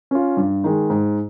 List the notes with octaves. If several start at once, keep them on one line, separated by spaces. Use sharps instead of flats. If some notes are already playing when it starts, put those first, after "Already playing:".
C#4 F4
G2
D#3 G#3
G#2